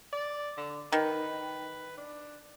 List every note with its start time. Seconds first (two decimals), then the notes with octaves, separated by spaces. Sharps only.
0.13 D5
0.58 D3
0.92 D#3 B4
1.98 D4